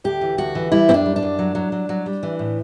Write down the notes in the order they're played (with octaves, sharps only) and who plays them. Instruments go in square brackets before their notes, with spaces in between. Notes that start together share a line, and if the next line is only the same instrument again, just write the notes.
[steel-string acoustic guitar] D2 G4
E3
D2 F#4
E3
G3 E4
F#2 C4
D4
G3
D4
F#2
F#3
F#3
F#3
F#3
G3
E3
A2